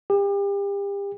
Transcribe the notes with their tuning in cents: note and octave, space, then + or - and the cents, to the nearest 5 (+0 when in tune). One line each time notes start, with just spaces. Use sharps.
G4 +35